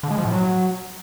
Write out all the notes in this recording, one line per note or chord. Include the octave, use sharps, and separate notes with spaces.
D3
G#3
F3
A2
F#3